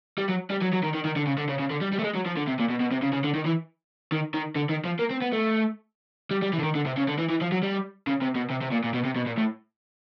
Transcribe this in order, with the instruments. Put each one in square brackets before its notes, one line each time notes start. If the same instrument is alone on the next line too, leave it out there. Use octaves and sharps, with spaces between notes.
[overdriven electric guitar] G3
F#3
G3
F#3
F#3
D#3
D#3
D#3
D3
C#3
D3
C#3
C#3
D3
G3
G3
A3
G#3
F#3
F3
D3
C3
A#2
B2
B2
C3
C#3
C#3
D3
D#3
E3
D#3
D#3
D3
D#3
F3
A#3
C4
B3
A3
G3
G3
E3
D3
D#3
D3
C3
C#3
D3
E3
E3
F3
F#3
G3
C#3
C3
B2
C3
C3
A#2
A#2
B2
C3
B2
A#2
A2